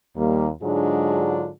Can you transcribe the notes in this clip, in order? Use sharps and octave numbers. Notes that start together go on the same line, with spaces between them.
D#2 G3 A#3
G#2 D3 F#3 G#3 D4 F4